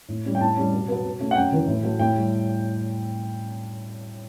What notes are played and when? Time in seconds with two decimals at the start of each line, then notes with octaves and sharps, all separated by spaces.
0.08 A2
0.25 G3 C#4
0.35 G5
0.41 A2 A5
0.57 G3 C#4
0.73 B2
0.88 F#3 B3
1.05 B2
1.19 A3 C#4
1.31 F#5
1.36 F#2 G5
1.52 C#3 E3 B3
1.67 A2
1.83 F#3 A3
1.99 A2 G5
2.16 G3